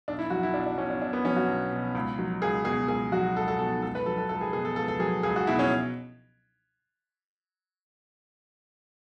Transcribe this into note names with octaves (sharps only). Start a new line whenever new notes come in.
B1 D4
E4
F#3 F#4
E4
B1 D4
D4
B2 C#4
D4
B1 D4
B3
F#3 C#4
F#4
B1
B2
C#2
F#3
C#2 G#4
B2 G#4
C#2 G#4
F#3 F#4
C#2 A4
A4
B2 A4
C#2 A4
B4
F#3 A4
A4
C#2 A4
G#4
B2 G#4
A4
C#2 A4
A4
F#3 G#4
C#2 G#4
F#4
B2 E4
C#4